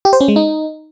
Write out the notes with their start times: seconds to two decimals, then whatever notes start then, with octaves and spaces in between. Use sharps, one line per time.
0.05 G4
0.13 C5
0.21 C#4
0.28 G#3
0.36 D#4